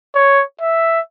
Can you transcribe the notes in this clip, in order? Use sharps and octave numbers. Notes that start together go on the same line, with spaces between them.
C#5
E5